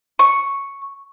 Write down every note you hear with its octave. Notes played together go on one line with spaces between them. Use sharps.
C#6